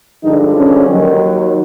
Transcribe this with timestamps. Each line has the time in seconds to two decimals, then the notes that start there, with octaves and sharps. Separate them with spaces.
0.23 G2 D3 F3 G#3 D#4
0.55 C#4
0.88 D#2 D#3 F#3